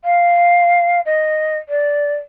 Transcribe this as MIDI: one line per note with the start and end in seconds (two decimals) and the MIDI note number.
0.04 1.01 77
1.06 1.57 75
1.69 2.14 74